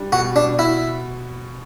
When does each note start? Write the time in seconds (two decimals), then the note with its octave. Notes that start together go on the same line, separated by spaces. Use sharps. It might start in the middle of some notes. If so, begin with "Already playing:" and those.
Already playing: G3 D4
0.12 B2 F#4
0.36 B2 D4
0.58 E4 F#4